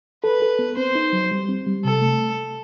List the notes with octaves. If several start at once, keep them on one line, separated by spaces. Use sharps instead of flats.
A4 B4
A4
B3
C4 C5
D#4
F#3
G3
C4
G3
C3 A4
A3